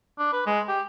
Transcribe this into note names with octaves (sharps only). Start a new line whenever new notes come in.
D4
B4
G#3
G4